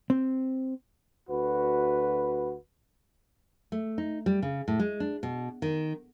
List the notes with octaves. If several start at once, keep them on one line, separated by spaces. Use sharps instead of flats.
C4
D2 F#4 B4
A3
D#4
G3
C#3
A2
G#3
D4
B2
D#3